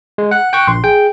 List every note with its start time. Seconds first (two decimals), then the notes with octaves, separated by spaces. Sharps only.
0.18 G#3
0.31 F#5 F#6
0.53 G5 C#6
0.68 A#1 C6
0.84 G#4 G5